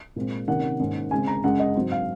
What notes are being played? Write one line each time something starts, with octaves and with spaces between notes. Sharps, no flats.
A#2 G#3 C4
C3 D#3 A#3 C#4 F#5
G#2 D#3 A#3 C#4
C#3 G#3 C4 G#5
A#5
F#2 C#3 G#3 F#5
D#5
G#2 F#3 C4
F5